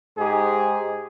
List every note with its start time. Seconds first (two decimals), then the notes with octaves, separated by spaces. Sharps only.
0.18 G#2 D#4 G4 G#4